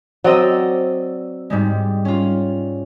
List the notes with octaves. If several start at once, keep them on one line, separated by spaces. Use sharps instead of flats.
F#3 C4 D5 D#5 E6
G#2 G3 G#3
C#4 F4